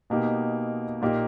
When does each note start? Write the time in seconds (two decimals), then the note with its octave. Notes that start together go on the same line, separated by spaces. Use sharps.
0.10 B2 A#3 D#4 G4
1.02 A#2 A#3 D#4 G4